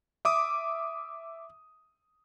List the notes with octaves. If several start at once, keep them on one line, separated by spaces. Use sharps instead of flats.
E5 D6 D#6